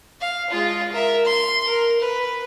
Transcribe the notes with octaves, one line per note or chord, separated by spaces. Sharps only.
F5
G#3 F4
A#4 E5
C6
A#4
B4